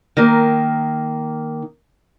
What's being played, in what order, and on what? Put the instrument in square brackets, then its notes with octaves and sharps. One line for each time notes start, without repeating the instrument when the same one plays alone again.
[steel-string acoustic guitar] D#3 A#3